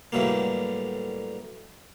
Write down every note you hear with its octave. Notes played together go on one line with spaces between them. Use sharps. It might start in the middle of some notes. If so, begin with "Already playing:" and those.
A2 D3 E3 F#3 G3 A#3